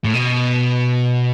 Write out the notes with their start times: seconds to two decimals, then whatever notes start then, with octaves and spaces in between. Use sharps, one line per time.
0.04 A2
0.14 B2